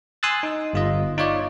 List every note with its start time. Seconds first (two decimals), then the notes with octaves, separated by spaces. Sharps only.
0.23 G#5 C6 D#6 E6 F#6 A6
0.43 D#4
0.73 G1 F4 D#5
1.18 D#4 F4 C#5 D5